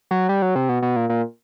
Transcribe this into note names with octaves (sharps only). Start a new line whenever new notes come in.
F#3
G3
F#3
C3
B2
B2
A#2
A#2